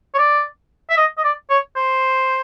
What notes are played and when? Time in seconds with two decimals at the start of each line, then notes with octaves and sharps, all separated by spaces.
0.14 C#5
0.18 D5
0.90 E5
0.97 D#5
1.17 D#5
1.24 D5
1.50 C#5
1.76 C5